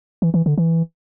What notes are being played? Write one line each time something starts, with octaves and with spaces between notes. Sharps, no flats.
E3
E3
D3
E3